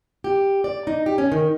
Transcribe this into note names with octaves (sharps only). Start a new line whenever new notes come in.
G4
D5
D#4
G4
C#4
D#3